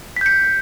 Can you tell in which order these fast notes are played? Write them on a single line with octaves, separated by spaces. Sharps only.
B6 G6 C#7